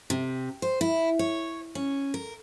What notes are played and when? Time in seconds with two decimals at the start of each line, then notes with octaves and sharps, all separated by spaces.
0.10 C3
0.62 C5
0.81 E4
1.19 C#5
1.75 C#4
2.14 A#4